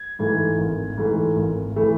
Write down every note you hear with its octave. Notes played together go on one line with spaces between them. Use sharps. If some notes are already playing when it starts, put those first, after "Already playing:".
Already playing: G#6
G#2 E3 A3
G#1
G#2 E3 A3
G#1
E3 A3